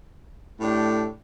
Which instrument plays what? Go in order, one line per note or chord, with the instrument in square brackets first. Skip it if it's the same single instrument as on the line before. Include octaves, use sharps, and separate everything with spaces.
[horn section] A2 A3 D4 G4